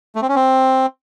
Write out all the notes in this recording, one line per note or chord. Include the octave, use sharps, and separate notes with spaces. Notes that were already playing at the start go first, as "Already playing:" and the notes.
A3
C4
C#4
C4